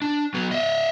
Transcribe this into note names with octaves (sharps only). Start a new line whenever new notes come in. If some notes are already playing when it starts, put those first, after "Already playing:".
D4
F#3 B3
D#5 E5